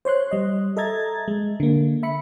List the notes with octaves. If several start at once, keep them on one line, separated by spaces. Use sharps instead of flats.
C5 C#5 C6 F#6
G3 D#5
A4 D#5 E5 A#5 G#6 A6
G#3
D3 A#3
E5 B5 C#7